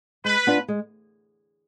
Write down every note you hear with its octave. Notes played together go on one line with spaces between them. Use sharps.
G#3 B4
B3 D4 F4
G#3